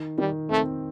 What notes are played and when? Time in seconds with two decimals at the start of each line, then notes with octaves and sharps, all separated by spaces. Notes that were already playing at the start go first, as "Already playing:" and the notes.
Already playing: D#3
0.18 D#3 G3
0.50 A3 C4